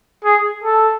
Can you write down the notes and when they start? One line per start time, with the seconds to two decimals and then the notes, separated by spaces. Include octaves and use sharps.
0.25 G#4
0.63 A4